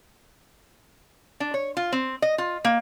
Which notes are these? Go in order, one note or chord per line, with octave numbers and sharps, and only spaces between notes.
D4
C#5
F4
C4
D#5
F4
A#3